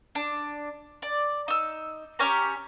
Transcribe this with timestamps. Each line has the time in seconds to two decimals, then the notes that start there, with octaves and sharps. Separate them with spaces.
0.15 D4
1.02 D5
1.48 D#4 E6
2.19 C#4 G4 C#5 A#5